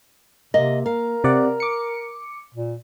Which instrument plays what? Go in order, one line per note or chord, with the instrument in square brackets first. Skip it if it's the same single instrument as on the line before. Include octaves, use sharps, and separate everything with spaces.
[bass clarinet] C3 [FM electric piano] A#3 [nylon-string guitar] D#5
[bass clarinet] A#4 [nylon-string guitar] F5
[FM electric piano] C3 D5 F#5
D6 C#7
[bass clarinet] A#2